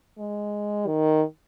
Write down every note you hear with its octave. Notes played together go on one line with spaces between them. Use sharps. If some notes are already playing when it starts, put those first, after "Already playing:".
G#3
D#3